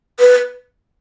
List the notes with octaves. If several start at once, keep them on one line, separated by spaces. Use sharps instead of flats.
B4